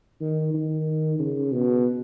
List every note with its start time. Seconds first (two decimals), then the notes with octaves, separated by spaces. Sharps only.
0.21 D#3
0.54 D#3
1.19 C#3
1.52 B2